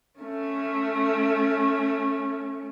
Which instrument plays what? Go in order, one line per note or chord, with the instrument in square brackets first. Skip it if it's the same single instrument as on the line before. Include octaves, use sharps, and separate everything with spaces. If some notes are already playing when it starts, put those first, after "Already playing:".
[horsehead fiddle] A3 C#4